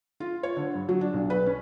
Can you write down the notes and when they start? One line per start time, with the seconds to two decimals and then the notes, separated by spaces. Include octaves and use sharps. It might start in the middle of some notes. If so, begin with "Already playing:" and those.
0.20 F4
0.43 C#5
0.57 D3
0.75 G2
0.89 F#3
1.01 D4
1.14 B1
1.30 B4
1.46 C#4